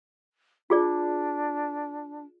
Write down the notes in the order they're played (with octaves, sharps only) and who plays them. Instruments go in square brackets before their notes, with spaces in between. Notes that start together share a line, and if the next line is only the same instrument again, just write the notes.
[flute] D4 [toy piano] F4 G#4 D5